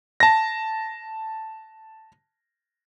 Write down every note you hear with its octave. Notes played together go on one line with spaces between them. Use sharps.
A5 A#6